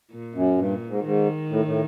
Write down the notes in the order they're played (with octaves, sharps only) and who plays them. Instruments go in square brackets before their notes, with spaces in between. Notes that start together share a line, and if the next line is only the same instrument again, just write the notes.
[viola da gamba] A#2
[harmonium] F#2
[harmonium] G2 [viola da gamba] A#2
[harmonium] G#2
[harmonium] G#2 [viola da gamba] D#3
[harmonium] A2
A2